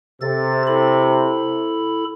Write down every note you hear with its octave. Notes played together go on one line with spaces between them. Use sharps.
C3 A4 A6
E4 A4 B5